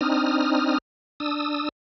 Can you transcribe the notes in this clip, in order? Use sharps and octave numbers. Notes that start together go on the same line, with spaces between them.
C4 D4 D#4 D#6 F6
D4 D#6 E6